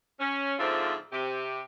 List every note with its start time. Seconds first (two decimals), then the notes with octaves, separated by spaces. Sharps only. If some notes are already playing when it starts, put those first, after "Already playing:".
0.20 C#4
0.59 G#2 D3 F3 C4 F4 E5
1.13 C3 G4